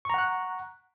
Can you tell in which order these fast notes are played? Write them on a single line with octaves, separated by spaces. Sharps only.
C#6 A#5 F#5 F#6